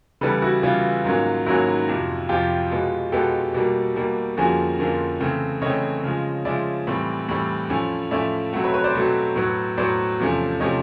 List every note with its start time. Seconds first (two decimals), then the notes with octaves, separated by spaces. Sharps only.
0.21 C#3 E3 G3 B3 A4 B4
0.42 E4 F#4
0.63 C#3 E3 G3 B3 F4
1.05 G#2 D#3 F#3 A#3 C#4
1.46 G#2 D#3 F#3 A#3 C#4 E4 F#4
1.88 F2 C3 F3
2.29 F2 C3 F3 F4 G4
2.71 B2 G#3 B3
3.12 B2 G#3 B3 G4 A4
3.54 B2 G3 A#3
3.96 B2 G3 A#3
4.37 F2 D3 F3 A#3 C#4 F#4 G#4
4.78 F2 D3 F3 A#3 C#4
5.20 C#3 E3 A3 C4
5.61 C#3 E3 A3 C4 C#5 D#5
6.03 C#3 F3 G#3
6.45 C#3 F3 G#3 D5 E5
6.87 A2 E3 G3 C4
7.29 A2 E3 G3 C4
7.70 A2 F3 A3 C#4
8.11 A2 F3 A3 C#4 D5 E5
8.53 B2 F#3 A3 C4 E5 F#5
8.63 B4 C#5
8.74 B4 C#5
8.84 C5 D5
8.95 B2 F#3 A3 C4
9.36 A2 F#3 B3
9.78 A2 F#3 B3 C5 D5
10.19 E2 C3 F3 A3 C#4
10.60 C3 F3 A3 C#4 C#5 D#5